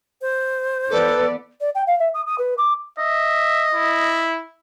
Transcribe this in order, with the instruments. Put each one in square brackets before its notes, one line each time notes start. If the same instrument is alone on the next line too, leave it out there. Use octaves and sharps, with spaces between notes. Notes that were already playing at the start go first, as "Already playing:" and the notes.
[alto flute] C5
[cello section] E3 B3 D5 [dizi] A4 [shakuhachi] B4
[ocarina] D5
G5
F5
E5
D#6
D#6
B4
D6
[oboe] D#5 [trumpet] E5
[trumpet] E4